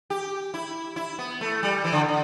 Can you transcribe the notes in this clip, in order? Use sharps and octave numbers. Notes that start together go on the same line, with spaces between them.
G4
E4
E4
B3
A3
G3
E3
D3
D3